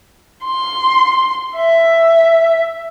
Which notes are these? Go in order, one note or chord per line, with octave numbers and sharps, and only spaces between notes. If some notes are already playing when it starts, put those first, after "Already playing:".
C6
E5